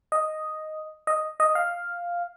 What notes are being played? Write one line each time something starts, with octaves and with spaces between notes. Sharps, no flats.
D#5
D#5
D#5
F5